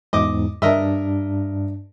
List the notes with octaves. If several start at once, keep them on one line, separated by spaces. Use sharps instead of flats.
E2 G#2 D#5 D6
G2 D4 A#4 D#5 E5